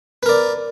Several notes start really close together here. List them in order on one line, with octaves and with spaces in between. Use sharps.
B4 A#4 D5